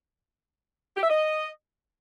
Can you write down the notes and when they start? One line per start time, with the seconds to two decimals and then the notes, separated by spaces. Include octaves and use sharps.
0.96 G4
1.03 E5
1.10 D#5